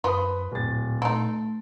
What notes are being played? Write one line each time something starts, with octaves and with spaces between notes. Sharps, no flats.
F#2 F3 F4 B4 B5 D#6
D1 A#2 A6
A3 D#4 A4 C6